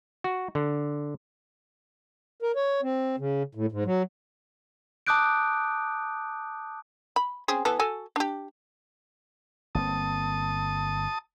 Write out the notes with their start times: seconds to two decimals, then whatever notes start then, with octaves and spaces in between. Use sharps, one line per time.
0.24 F#4
0.55 D3
2.42 A#4
2.56 C#5
2.83 C4
3.19 C#3
3.55 A2
3.72 G#2
3.85 F#3
5.07 A5 D6 D#6 F#6 G6 D7
7.16 B5
7.48 C4 C#4 G#4
7.65 E3 B3 A4
7.80 F#4 A4 G#5
8.16 D4 G4
9.75 G1 A#3 C4 A5 D#6